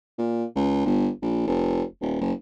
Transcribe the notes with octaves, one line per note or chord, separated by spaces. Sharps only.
A#2
C#2
G1
A#1
F1
D#1
F#1